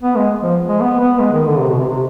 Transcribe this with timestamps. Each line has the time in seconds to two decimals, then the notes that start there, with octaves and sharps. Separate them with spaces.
0.02 B3
0.16 G#3
0.42 F3
0.67 G#3
0.80 B3
1.00 B3
1.19 G#3
1.32 D#3
1.47 D3
1.60 C3
1.69 B2
1.79 C3
1.89 C3